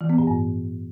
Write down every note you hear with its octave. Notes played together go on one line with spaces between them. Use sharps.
E3
B3
A2
G2